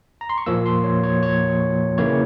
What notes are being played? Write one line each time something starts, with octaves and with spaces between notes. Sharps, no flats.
A#5
C6
C#6
A#2 F3 A#3 E6
C6
C#5
C#5
C#5
C#3 E3 A#3 E4 C#5